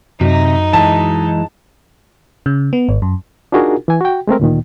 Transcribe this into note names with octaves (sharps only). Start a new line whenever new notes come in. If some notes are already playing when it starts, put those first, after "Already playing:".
F#2 C3 D#4
E3 G3 G#3 A5
C#3
B3
G#1
F#2
D4 D#4 F4 F#4 G#4 A#4
E3 G#5
F#4 G5
G#3 A3 C4 A#4
D2 A#2 D#3